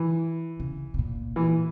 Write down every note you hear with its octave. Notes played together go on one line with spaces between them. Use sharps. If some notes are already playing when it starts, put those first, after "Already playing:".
Already playing: E3
C#3
C#3
A#2
E3